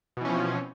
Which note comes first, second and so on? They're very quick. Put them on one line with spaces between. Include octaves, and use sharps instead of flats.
B2 E3 C#4 F3 C4